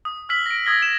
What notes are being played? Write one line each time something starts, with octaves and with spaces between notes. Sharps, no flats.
D#6
E6 F6 B6 F#7
A#6 D7
D#6 E6 G#6 A#6 G7
E7